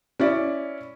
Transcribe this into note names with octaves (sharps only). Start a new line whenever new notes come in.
C#4 E4 D5